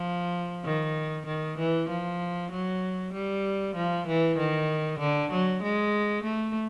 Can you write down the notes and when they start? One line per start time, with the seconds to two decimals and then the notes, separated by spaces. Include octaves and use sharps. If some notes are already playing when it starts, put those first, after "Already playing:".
Already playing: F3
0.65 D#3
1.27 D#3
1.58 E3
1.89 F3
2.51 F#3
3.13 G3
3.76 F3
4.07 E3
4.38 D#3
4.99 D3
5.31 F#3
5.63 G#3
6.24 A3